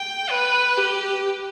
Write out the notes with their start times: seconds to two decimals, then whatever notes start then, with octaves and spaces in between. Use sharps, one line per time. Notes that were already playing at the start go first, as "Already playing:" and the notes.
Already playing: G5
0.30 B4
0.77 G4